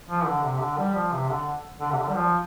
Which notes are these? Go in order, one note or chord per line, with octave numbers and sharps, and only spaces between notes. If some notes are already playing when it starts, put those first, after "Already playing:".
F3
D3
C3
D3
G3
F3
C3
D3
D3
C3
D3
G3
F3